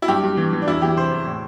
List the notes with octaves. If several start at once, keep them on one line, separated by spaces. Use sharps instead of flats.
E4
G2 G4
G2
E3
E3
D4
E2 E4
E3 G4
C3 C5
E2
A2